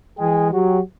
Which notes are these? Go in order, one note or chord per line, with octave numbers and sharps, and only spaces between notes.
E3 G#3 G#4 G5
F#3 G4